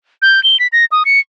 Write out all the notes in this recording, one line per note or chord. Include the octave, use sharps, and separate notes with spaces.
G6
G7
B6
A#6
D#6
C#7